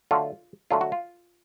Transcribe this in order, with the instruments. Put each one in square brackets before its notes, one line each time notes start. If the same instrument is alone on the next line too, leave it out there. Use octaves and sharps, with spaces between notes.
[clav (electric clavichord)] D3 F#3 A3 F4
D3 F#3 A3 F4
F#4
F4